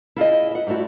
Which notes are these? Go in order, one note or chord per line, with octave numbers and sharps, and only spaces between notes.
E4 F4 G#4 D#5
E5 F#5
G#2 G3 A3 E4 F#4